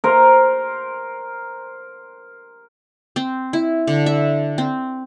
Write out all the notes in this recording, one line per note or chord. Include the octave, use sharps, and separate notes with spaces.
A#4 C5
C4
E4
D3
E5
C4